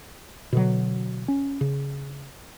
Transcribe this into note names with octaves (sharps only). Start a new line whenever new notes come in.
B2 D3 F#3
C#4
C#3